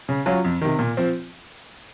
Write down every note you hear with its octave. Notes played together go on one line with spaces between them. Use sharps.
C#3
F#3 C#4 F4
F2
C3 D#3
A#2
F3 C4